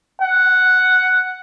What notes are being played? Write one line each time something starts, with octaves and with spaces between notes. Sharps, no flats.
F#5